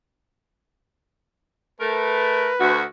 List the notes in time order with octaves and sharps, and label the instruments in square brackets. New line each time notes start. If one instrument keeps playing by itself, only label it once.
[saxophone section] A3 A#4 [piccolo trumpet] B4
[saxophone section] D2 F#4